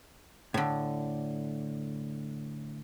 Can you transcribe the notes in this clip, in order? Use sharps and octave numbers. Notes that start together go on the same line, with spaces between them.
A2 D3